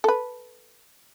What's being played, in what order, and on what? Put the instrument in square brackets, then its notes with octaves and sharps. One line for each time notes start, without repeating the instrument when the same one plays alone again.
[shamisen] A4 B4